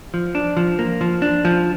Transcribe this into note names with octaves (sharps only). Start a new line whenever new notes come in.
F3
D4
F3
A#3
F3
D4
F3